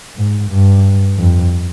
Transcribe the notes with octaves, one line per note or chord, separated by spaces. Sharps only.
G#2
G2
F2